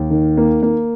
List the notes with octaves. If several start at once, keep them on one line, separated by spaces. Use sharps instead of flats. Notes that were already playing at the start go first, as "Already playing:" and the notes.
Already playing: D#2
D#3
A#3
A#3